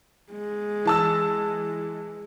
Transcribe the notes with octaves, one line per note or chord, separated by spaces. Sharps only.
G#3
E3 A5 E6